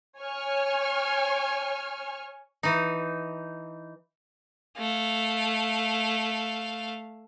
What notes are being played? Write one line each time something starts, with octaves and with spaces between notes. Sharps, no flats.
C#5 G#5 C#6 F6
E3 D#4
A3 F5